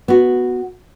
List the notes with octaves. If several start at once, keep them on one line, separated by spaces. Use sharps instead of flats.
B3 F#4